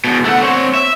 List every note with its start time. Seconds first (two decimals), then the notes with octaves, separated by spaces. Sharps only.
0.04 E2 B2
0.25 A3 F#5
0.43 C4 C#5
0.74 E5